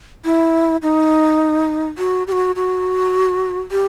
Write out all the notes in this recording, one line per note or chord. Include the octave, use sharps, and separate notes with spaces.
E4
D#4
F#4
G4
F#4
F#4
G4